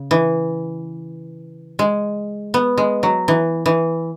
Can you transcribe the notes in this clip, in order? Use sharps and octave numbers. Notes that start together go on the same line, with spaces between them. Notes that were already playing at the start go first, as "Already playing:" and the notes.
Already playing: C#3
E3
G#3
B3
G#3
F#3
E3
E3